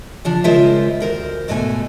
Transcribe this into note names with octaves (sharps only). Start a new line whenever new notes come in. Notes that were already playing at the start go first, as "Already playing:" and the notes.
C#3 F3 D4
C#3 G#3 F4 A#4 C5 E5
D2 A#4 C5
G#2 B2 D3 A3 C#5 G#5